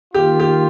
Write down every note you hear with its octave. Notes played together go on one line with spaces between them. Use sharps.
D#3 A#3 F4 G4
G4